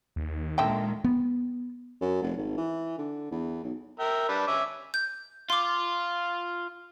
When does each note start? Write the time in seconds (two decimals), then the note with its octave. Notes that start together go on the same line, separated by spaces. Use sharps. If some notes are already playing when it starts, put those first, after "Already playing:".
0.16 D#2
0.58 A#2 D3 D#3 G#3 E5 G5
1.04 B3
2.01 F#2
2.22 F1
2.37 G#1
2.57 E3
2.98 D3
3.31 E2
3.63 B1
3.99 A#4 E5 G5
4.29 G3 D4 B4
4.47 C#4 E5 D6
4.94 G6
5.50 F4 C6 D6